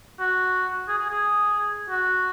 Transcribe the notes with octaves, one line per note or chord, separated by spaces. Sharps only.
F#4
G#4
G#4
G#4
F#4